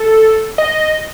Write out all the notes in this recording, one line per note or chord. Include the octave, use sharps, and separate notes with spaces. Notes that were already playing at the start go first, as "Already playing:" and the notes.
Already playing: A4
D#5